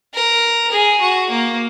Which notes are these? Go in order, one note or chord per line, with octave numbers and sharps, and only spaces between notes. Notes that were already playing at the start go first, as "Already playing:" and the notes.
A#4
G#4
F#4
A#3